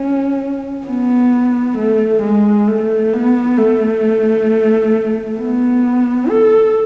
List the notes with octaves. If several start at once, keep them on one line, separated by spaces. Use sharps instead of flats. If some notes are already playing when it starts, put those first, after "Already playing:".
Already playing: C#4
B3
A3
G#3
A3
B3
A3
B3
A4